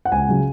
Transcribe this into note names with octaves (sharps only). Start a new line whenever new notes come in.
F#5
C#2 G#5
C#3 F#3 C#4